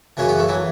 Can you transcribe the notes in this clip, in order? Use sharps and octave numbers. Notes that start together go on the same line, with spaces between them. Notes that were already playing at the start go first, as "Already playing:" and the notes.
F#2 C#3 E3 C#4
B3
A3
E3 F#3